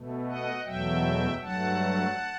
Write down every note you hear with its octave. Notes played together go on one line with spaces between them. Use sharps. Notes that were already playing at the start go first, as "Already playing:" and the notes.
Already playing: B2 A3
D#5 F#5
E2 B2 F#3 A3 E5 G5
G2 F#3 A3 F#5 A5